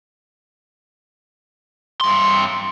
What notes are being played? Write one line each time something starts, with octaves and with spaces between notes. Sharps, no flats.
G2 C6